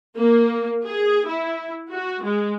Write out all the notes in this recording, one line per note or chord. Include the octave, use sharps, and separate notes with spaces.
A#3
G#4
E4
F#4
G#3